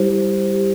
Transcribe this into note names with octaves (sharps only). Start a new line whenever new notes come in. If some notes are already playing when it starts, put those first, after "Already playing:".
Already playing: G3 E4 G4 C5
C5
G4